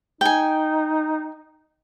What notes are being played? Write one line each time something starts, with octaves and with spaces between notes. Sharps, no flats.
D#4 G5 G#5